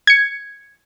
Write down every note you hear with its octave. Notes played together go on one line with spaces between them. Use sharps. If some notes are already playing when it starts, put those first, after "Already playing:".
G#6 C#7